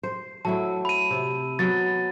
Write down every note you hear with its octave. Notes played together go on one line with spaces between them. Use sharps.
C5
F#3 A3 E4 A5
B5 D#7
C3
F#3 B3 A6